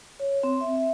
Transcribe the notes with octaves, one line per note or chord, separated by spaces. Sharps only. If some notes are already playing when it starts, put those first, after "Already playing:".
C#5
C4
E5
E5